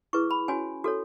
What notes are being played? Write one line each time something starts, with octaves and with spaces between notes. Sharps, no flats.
E4 G#4 B4 C#6
B5
C#4 F#4 C#5 G#5
F#4 A4 C#5